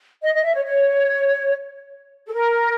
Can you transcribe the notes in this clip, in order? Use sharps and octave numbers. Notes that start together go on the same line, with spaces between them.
D#5
D#5
E5
C#5
C#5
A4
A#4